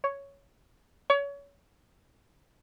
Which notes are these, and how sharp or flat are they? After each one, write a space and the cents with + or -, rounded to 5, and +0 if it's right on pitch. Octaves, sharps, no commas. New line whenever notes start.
C#5 +5
C#5 +30